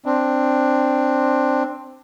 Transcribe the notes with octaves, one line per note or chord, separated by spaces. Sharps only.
C4 D4